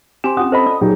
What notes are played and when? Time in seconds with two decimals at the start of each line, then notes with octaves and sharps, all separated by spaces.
0.24 C4 G4 G#5 C6 E7
0.37 C#4 F4 F#5 D#6
0.52 A4 C5 D#5 B5
0.66 D5 D#6
0.81 A#2 F#3 D#4 G4 G#4